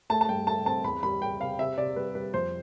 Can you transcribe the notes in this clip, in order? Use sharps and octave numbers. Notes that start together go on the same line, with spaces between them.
A3 A5
A5
G2 G5
A3 A5
C4 A5
E2 B5
G3 B5
G3 G5
C3 F5
C3 E5
C3 D5
G3 B4
G3 B4
F2 C5